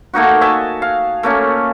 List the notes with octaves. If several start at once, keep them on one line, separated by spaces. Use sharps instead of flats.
A3 A#3 D#4 F#4
D#5 E5 G#5 A5
F5
A3 A#3 C#4